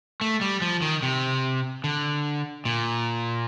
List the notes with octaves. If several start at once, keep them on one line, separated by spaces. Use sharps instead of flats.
A3
G3
F3
D#3
C3
D3
A#2